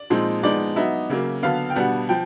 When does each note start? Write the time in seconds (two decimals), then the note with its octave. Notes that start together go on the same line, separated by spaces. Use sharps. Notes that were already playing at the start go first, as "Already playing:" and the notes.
Already playing: D5
0.10 A#2 F3 G#3 C4 D#4
0.43 F3 G#3 B3 D#4 D5
0.76 F#3 B3 D#4 E5
1.10 C#3 F#3 A#3
1.43 D3 F#3 B3 F5
1.70 G5
1.76 B2 G3 B3 D4 F#5
2.09 F3 G5